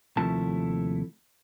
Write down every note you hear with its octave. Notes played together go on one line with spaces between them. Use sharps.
D#2 C3 F3 A3 E4 A5